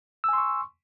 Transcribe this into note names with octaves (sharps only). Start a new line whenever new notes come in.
G#5 C6 C#6 E6